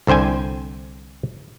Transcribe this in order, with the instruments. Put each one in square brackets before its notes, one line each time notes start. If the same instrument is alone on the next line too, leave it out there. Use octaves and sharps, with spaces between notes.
[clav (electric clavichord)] C2 D3 C5 G5 G#5